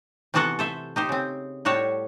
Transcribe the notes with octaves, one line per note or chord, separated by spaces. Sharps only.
C3 E3 B3 F#4 A4 F#5
A4 C5 E5
D#4 G4 C5
C#3 C4
A2 G3 F#4 C#5 A5